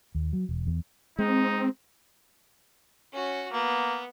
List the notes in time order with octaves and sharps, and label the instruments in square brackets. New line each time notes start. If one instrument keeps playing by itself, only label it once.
[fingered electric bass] D#2
F#3
E1
E2
[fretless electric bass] G#3 [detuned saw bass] C4 [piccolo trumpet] D#4
[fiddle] C#4 F#4
[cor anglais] A#3 [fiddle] B3